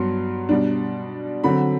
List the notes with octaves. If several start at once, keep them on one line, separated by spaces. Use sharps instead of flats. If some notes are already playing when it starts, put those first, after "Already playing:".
Already playing: G2 F#3 B3 C6
B2 G3 D4
D3 F#3 C4 B5